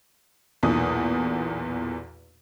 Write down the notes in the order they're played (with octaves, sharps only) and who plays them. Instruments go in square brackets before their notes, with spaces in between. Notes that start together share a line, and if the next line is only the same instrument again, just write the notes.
[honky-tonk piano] B1 E2 A#2 D#6